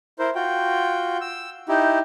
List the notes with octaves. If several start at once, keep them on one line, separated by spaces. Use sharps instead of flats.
E4 A#4 C5
F4 F#4 G5
E6
D#4 E4 G4